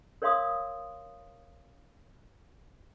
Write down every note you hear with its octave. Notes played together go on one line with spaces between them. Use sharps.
A#4 C#5 D5 F5 C6 D#6